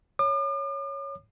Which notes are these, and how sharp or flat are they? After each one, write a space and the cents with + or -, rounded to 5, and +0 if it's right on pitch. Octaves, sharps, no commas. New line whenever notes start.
C#5 +0 D6 +45